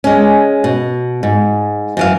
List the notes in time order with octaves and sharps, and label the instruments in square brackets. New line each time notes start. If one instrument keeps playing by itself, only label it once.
[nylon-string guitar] G#3 C#4
B2
G#2
F#2 E3 F5